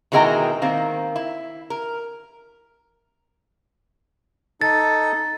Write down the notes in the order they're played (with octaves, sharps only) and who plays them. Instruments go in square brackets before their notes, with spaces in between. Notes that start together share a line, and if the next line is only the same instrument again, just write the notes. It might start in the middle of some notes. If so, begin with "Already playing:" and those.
[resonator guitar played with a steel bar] B2 D#3 G#3 E4 G5 A#5
D#3 A#3 C4
E4
A#4
[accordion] D#4 A4 [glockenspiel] A6